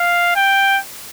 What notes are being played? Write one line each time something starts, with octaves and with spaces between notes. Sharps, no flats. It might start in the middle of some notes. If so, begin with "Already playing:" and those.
Already playing: F5
G5